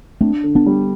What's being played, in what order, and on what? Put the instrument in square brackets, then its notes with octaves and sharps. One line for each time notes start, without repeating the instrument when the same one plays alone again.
[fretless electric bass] A3 C4 [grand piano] D4
[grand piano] D3
[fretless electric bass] B3 D4
[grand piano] G3